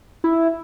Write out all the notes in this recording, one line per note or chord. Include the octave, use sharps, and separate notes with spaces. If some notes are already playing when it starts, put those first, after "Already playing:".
E4